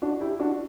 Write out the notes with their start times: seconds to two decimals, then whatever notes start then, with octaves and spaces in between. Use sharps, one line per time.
0.02 D4 F#4
0.20 E4 G4
0.39 D4 F#4